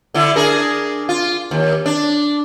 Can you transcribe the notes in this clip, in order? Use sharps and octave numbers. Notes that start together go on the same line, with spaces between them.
D3 D4 E4
D4 G#4 A#4
F4
D#2
D4